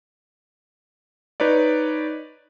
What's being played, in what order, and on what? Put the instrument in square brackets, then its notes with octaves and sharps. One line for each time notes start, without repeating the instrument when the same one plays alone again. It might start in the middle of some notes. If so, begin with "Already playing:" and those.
[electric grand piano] D#4 B4 C#5 D5